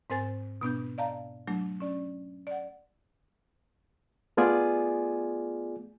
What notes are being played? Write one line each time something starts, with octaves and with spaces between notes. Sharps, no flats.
G#2 C4 A#4 C5 G#5 A6
B2 B3 D4 G6
D5 D#5 F5 A5 A#5
F#3 A3 D4
C#4 D5
D5 F#5
A3 B3 F4 G#4 D5 G#5